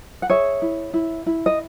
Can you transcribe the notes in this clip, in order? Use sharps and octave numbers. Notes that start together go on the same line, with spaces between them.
F#5
G#4 C#5 E5
E4
E4
E4
D#5